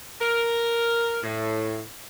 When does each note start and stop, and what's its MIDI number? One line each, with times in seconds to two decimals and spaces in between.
0.21 1.17 70
1.23 1.83 45